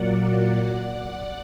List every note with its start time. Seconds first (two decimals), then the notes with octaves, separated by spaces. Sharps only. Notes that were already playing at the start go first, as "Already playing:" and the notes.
Already playing: A#2 F#3 A#3 D5 F#5
0.37 D5 F#5
0.86 D5 F#5